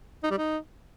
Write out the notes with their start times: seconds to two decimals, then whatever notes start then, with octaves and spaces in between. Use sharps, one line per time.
0.23 D#4
0.31 G3
0.38 D#4